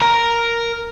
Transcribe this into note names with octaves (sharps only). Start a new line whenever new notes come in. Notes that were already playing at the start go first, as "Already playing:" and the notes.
A#4 A#5